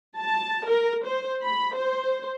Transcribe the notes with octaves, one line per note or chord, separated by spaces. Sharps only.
A5
A#4
C5
B5
C5